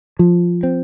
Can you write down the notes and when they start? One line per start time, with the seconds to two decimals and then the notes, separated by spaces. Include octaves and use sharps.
0.19 F3
0.63 C4